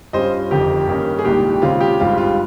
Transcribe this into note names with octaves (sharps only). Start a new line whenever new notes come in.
G2 G3 C#4 F4 C5 D#5
G1 F2 D#3 G4
G2 D#3 A#3 C#4
G#4
C2 A#2 G#3 D#4 G4
D#2 C#3 G#3 C4 F4
G4
G#1 G2 G3 C4 F4
F4